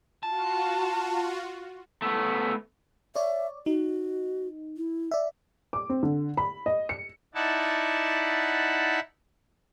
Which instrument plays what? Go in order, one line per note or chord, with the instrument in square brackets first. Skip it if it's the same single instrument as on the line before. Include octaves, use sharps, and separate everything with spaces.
[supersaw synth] F4 F#4 [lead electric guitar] A5
[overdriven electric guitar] A3 B3
[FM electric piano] C#5 D5 [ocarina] E5
[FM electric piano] D#4 [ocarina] F#4
[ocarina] E4
[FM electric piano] D5 E5
[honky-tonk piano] D6
C4
D3
B5
D#5
C#7
[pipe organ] D#4 E4 D5 E5 F#5 A5